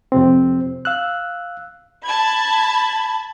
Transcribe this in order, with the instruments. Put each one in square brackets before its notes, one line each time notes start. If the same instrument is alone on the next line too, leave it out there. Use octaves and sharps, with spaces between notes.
[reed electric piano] F2 C3 C4
F5 E6 F#6
[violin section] A5 B5 G#6